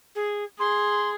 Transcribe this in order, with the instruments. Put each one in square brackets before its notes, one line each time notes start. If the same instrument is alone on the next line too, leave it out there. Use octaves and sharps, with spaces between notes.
[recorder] G#4
[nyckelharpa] G#4 [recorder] C6